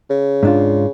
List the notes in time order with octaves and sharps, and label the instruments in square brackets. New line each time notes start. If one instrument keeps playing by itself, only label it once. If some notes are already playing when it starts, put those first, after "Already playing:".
[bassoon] C#3
[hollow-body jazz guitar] G#2 D4 F4